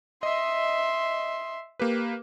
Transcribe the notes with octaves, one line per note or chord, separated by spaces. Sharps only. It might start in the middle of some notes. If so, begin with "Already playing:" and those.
D#5 E5 C6
A#3 G4 B4